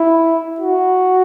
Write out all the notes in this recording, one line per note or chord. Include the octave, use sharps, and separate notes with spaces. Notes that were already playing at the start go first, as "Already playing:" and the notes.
Already playing: E4
F#4